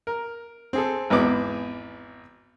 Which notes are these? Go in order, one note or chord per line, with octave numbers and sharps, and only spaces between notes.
A#4
C4 G#4 A4
G#1 E2 B4 D6